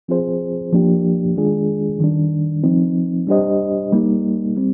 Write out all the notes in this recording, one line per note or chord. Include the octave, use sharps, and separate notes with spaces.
F3 C4 F4 G#4 C5
F3 A#3 D4 G4
D#3 G#3 D4 F4 G#4
D#3 G3 D4
F3 C4 D#4
G3 D4 G4 C5 D#5
G3 A#3 D#4
G3 C4